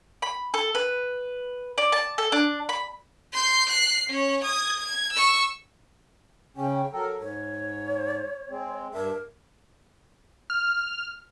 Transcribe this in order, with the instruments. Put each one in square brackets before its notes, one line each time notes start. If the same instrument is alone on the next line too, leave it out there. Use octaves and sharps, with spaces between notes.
[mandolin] B5
A4
B4
D5
A5
A4
D4
B5
[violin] C6 G6
F#6 C7
C#4 C#5
D#6 G#6
G#6
C#6 E6
[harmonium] C#3 C#4 [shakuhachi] G5
[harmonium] F#3 A4 A#4
[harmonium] G#2 [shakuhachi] C#5
[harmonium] G#3 C4
[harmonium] G2 D4 E5 [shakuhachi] A#4
[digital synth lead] F6